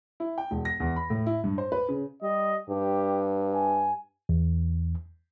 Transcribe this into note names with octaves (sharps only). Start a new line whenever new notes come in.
E4
G5
E1
A#6
E2
B5
A2
E4
G2
C5
B4
C#3
G3 D#5
G2 G4
G#5
E2